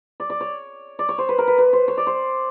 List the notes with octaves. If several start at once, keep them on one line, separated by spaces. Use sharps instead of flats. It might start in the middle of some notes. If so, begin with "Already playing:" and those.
D5
D5
C#5
D5
C#5
C5
B4
A#4
B4
B4
C5
C#5
D5
C5